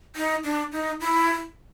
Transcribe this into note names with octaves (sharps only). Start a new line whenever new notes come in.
D#4
D4
D#4
E4